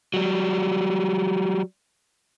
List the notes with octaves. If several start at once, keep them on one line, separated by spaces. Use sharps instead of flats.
F#3 G3